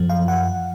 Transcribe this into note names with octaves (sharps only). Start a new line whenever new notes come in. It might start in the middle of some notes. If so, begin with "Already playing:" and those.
Already playing: F#2 F3
F5
F#5